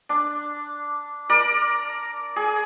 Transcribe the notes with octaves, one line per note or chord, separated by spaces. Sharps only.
D4
A#4 D5
G#4